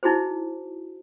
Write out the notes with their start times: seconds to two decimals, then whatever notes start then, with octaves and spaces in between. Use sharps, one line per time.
0.03 D#4 E4 F#4 G#4 C5